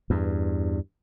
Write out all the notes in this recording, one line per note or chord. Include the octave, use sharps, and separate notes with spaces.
E2 G2